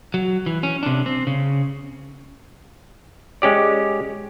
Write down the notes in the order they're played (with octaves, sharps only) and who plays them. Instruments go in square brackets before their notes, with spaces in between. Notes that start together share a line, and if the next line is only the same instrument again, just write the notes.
[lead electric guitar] F#3
E3
C#4
C3 D4
C4
C#3
[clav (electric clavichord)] G#3 C#4 G4 D5